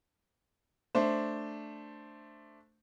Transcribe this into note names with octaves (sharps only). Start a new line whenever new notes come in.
A3 D4 C5